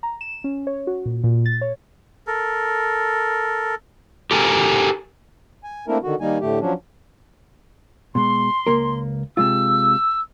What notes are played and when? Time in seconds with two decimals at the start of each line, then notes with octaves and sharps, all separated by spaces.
0.03 A#5
0.21 E7
0.44 C#4
0.67 C#5
0.87 F#4
1.06 A#2
1.24 A#2
1.46 A6
1.61 C#5
2.27 A4 A#4
4.31 G4 A4 A#4 G#5
5.64 G#5
5.88 A3 A#3 C4 D4 E4 A#4
6.03 D3 D#3 F#4
6.21 D#3 G3 A#3 D#4 G#5
6.41 A2 D3 A3 G4
6.60 F3 F#3 C#4 D4
8.15 B2 G#3 C6
8.67 C#2 A#3 A#4
9.37 C3 G#3 F4 E6